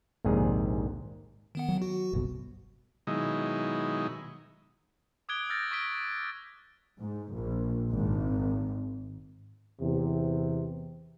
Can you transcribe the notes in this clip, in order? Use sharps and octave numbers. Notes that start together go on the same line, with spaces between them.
A#1 D#2 G#2 C3 G#4
D#3 B3 F#5
F#3
F#4
G1 C2 B2
B2 D#3 F#3 G#3 D#4 E4
D6 D#6 F#6 G#6 D7 G7
E6 F6 G6 A6 A#6 D7
C#6 D#6 A#6 B6 D7 G7
G#2
A#1
G#1
E2 C3